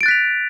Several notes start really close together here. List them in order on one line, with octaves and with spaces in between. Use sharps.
D7 A6 F#6 B6 F7